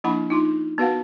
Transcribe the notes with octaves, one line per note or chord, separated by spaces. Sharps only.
F3 A#3 D4 E4 F#5 B5
D#4 F4 C6
B3 F#4 B4 F5 F#5